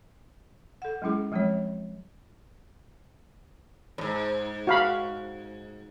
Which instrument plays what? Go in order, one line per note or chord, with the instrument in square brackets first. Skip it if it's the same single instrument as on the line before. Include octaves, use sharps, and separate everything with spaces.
[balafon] A4 F#5
F#3 G#3 C#4 E4 G#4
F3 F#3 G#3 C4 C#5
[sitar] F2 G#2
[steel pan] F#4 F5 B5